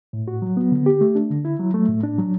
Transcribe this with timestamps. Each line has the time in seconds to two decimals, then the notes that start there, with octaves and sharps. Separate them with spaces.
0.13 A2
0.28 F#4
0.42 F#3
0.57 B3
0.72 D3
0.86 G4
1.01 A3
1.15 D4
1.30 D3
1.45 E4
1.59 F#3
1.74 A3
1.89 A2
2.04 D4
2.18 F#3